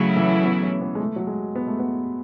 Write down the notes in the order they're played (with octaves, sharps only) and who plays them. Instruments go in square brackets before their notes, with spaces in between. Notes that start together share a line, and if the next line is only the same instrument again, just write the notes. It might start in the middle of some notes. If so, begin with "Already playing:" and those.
Already playing: [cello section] C#3 F#3 A3 E4
[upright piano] E3
B3
C#4
B3
G#3
A3
F#3
G#3
B3
A3
B3